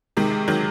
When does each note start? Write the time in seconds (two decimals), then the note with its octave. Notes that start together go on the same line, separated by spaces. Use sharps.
0.17 C3 D#3 G#3
0.48 D#3 F#3